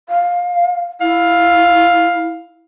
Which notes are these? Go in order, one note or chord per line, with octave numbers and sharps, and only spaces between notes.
F5
E4 F5